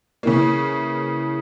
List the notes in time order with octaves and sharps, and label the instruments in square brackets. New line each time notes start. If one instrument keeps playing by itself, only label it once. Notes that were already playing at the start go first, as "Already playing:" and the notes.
[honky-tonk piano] C#3 E3 A#3